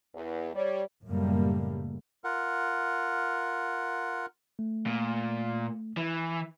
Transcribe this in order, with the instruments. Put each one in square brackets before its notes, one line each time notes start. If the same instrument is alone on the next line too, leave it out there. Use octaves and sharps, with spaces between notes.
[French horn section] E2
G3 C#5 D5
[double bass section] F#2 A2 C#3 G3 A3 A#3
[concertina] F4 A#4 F#5
[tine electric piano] A3
[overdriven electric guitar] A#2
E3